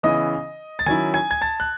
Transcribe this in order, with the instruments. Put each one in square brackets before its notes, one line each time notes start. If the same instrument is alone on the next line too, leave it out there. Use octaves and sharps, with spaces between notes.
[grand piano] C#3 E3 B3 E4 D#5 D#6
A6
D#3 F#3 C#4 E4 G#5 G#6
G#5 G#6
G#6
A5 A6
F#6